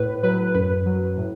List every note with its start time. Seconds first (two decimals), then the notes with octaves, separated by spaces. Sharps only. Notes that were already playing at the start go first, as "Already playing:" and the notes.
Already playing: A2 B4
0.23 F#3 B4
0.55 F#2 B4
0.86 F#3
1.17 A2